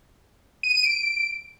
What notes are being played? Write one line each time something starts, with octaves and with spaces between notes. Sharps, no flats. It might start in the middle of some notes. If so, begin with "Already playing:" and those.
D#7
D#7
D7